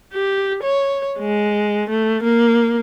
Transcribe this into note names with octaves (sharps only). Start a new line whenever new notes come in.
G4
C#5
G#3
A3
A#3